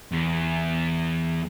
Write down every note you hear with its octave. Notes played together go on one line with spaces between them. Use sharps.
E2